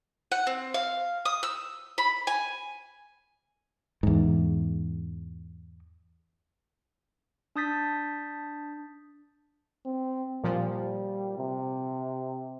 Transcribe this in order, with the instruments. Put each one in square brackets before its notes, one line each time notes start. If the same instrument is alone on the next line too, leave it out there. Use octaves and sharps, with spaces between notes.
[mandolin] F#5
C4
F5
D#6
E6
B5
G#5
[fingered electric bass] E2 G#2
[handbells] D4 A5 D#6 G6 A6 B6
[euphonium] C4
[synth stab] A#2 F3 [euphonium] G3
[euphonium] C3